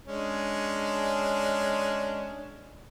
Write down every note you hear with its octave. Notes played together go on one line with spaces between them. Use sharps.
G#3 C#4 D4